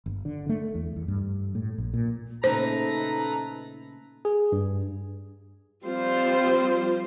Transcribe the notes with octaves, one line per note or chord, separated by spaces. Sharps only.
G1
D3
A3
E2
E2
G2
A2
A#1
A#2
A#2 C#3 A3 D#4 A4 B4 C5 A#5
G#4
G2
F3 G3 C4 F4 C5